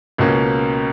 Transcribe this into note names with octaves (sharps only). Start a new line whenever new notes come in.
C#2 B2 A#3 C#4